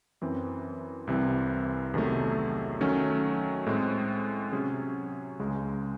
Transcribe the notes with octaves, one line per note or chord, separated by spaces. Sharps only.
F#2 E3 C4
C2 C3 E3 C4
E2 C3 D#3 F#3 A3
D#3 F#3 A3 C#4
A2 G#3 C4
C3 F#3 C#4 G#4
C#2 C#3 G#3